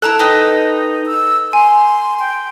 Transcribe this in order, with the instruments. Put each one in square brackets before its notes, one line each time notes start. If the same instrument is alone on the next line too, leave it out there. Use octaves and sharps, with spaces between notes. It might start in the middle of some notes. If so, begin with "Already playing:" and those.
[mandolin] E4 E6 F#6 [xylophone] A4 A5 A#5
[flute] D#4 [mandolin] B4 D#5 G5
[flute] E6
[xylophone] G#5 [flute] C6
[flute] G5